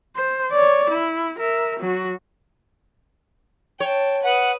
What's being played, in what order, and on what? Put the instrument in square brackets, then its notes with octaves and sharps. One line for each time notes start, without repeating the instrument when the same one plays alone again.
[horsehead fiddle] C5
C#5 D5
E4
A#4 E5
F#3 F#4
[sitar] C#5 [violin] G5 A5
[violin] B4 D#6 [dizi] F#5